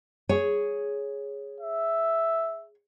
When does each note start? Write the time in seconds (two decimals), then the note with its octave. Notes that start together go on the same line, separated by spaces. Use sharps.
0.29 G#4 C#5
1.60 E5